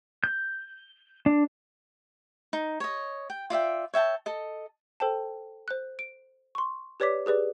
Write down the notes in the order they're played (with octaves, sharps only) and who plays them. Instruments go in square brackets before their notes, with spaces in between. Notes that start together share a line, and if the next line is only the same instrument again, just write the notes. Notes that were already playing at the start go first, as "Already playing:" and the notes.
[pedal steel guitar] G6
D4
[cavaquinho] D#4
C#5 D#5
G5
F4 D5 E5 G5
C#5 E5 G5 A5
A4 D#5
[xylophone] A4 C5 G5 A5
C5 F#6
D7
C6 C#6
G4 B4 C#5 D5 D6 B6
G4 G#4 B4 D5